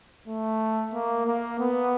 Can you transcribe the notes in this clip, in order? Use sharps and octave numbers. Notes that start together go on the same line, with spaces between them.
A3
A#3
A#3
B3